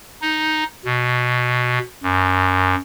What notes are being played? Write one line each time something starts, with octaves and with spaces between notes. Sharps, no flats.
D#4
B2
F#2